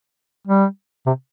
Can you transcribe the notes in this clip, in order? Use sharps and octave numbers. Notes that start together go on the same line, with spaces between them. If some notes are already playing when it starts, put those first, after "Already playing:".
G3
C3